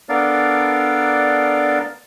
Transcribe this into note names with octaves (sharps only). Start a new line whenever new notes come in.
B3 D4 A4 A#4 D5 F5